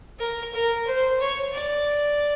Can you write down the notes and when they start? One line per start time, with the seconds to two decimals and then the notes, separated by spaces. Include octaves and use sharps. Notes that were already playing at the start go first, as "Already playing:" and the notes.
0.19 A#4
0.53 A#4
0.87 C5
1.20 C#5
1.53 D5